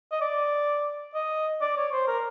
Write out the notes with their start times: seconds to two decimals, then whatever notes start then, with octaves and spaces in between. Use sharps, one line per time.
0.12 D#5
0.21 D5
1.14 D#5
1.61 D5
1.77 C#5
1.92 C5
2.08 A#4